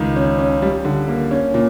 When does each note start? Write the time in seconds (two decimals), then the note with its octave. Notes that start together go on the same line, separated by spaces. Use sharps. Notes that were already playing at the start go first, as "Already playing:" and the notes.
Already playing: C#2 D#3
0.16 C#4
0.38 C#4
0.62 G3
0.85 D3
1.08 A#3
1.31 C#4
1.54 A#2